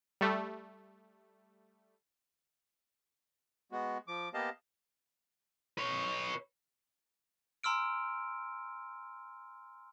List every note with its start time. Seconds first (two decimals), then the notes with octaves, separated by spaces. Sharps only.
0.21 G3 A3
3.72 G#3 B3 F#4
4.08 F3 D6
4.34 A#3 B3 G4 D#5 F5 A5
5.78 B4 C#5
7.64 G#5 A#5 C6 E6 F6 D7